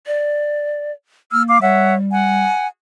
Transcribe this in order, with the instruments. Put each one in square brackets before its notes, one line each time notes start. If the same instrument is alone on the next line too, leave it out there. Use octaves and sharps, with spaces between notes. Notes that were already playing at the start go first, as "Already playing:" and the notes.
[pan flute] D5
[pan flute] A#3 [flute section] E6 F6
[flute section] F5 D6
[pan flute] G3 [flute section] C#5 E5 F#5
[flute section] F#5 G#5